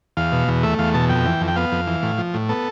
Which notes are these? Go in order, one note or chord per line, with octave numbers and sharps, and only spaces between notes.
E2 F5
B2
E2
A3 E5
E2 F5
B2 A5
F2 G5
E3
F2
G5
B3 F5
F2
E3
A2
F3
A2
B3 A4